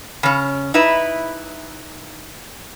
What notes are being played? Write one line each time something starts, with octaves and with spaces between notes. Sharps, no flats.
C#3 C#4
D#4 E4 B4 E5